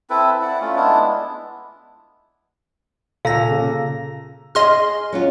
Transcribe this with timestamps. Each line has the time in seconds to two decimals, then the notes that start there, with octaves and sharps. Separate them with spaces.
0.10 C4 E4 A4 B4
0.42 E4 D5 F#5
0.61 A3 C#4 F4
0.75 G#3 B3 D4 E4
3.25 A#2 A4 F5 A#5 A#6
3.51 C#3
4.55 G#4 D#5 C6 F6
5.13 F#3 C#4 F4